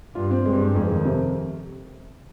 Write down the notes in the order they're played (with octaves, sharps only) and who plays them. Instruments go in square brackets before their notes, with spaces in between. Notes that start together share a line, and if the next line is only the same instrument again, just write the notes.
[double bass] G2 [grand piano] F4
[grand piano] C4
[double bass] G2 [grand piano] G#3
[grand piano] G#3
[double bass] F2 [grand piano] G#3
[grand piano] D#3
C3